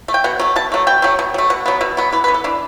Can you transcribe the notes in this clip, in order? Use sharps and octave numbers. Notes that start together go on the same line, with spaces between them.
A3
G5
B2 F#5
F#3 A3
B2 A5
F#3 A3
B2 G5
F#3 A3
B2
F#3 A3
B2 F#5
F#3 B3
B2 E5
F#3 B3
E3 B4
B4
B3
A4
E3 D4